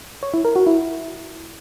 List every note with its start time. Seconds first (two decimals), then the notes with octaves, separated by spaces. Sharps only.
0.23 C#5
0.34 E4
0.45 A#4
0.56 F#4
0.67 E4